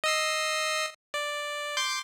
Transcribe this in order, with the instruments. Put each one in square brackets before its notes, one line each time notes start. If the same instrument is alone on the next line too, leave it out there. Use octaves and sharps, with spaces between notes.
[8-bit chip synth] D#5 E6 C7
D5
C6 D6 G6